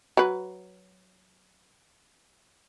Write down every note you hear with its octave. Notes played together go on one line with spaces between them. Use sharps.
F#3 B4